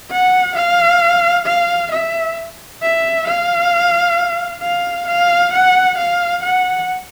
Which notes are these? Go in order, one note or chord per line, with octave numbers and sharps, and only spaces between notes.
F#5
F5
F5
E5
E5
F5
F5
F5
F#5
F5
F#5